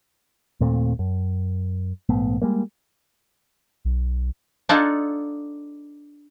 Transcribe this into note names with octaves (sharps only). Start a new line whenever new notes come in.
D#2 A#2 A3 C4
F#2
A#1 G#2 A3 B3
G3 G#3 A#3
B1
D4 D#4 F4 G#4 A4 F#5